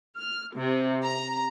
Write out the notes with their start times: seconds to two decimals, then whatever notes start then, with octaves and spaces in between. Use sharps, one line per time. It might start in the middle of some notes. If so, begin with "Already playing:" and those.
0.18 F6
0.57 C3
1.04 A#5